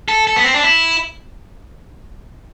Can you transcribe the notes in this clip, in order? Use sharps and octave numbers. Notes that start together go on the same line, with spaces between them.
A4
A4
B3
C4
D4
E4